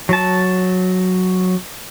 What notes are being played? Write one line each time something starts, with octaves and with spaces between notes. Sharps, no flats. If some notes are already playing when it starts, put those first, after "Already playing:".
F#3 A5